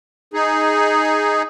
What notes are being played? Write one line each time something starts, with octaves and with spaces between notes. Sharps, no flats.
D#4 G#4